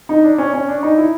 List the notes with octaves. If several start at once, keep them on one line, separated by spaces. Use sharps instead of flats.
D#4
D4
C#4
C#4
D4
D#4
E4